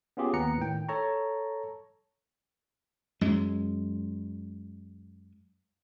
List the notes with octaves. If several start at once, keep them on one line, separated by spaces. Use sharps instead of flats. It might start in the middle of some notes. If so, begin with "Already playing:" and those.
B3 C#4 F4 G4 G#4
D#2 B3 F#5 A#5 C#7
A2 D#3 G5
A4 C#5 A5 A#5 C#6
F#2 G#3